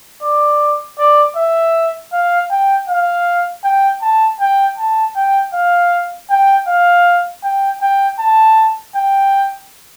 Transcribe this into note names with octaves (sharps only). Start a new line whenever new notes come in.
D5
D5
E5
F5
G5
F5
G5
A5
G5
A5
G5
F5
G5
F5
G5
G5
A5
G5